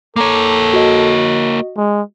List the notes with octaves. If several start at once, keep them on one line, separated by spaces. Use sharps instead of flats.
A#3 A4 C#5 A#5 D6
F#4 D#5
G#3